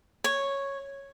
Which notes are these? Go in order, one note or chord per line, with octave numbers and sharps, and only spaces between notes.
C#5